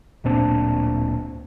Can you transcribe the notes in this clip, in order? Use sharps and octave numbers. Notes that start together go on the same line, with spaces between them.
D1 A#2 C4 D4